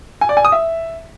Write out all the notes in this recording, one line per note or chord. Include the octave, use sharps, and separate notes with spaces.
G#5
D5
G#5
D#6
E5